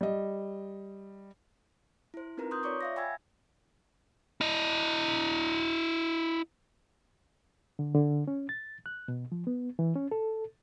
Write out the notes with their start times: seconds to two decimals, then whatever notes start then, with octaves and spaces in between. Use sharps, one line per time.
0.01 G3 D#5
2.14 E4 C5
2.37 C4 D#4 F4 A#4 B4 A#5
2.51 C6 D#6 F#6 G6
2.63 F4 C#5 D5 C#6 D6
2.81 E5 F5 A#6
2.96 G5 G#5 B5 E6 G#6 A6
4.41 E4 D#5
7.79 D3
7.95 D3
8.28 C#4
8.49 A6
8.86 F#6
9.08 B2
9.32 F3
9.47 B3
9.79 E3
9.96 C#4
10.11 A4